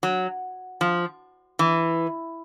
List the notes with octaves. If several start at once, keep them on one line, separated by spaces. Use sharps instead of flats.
F#3
F3
E3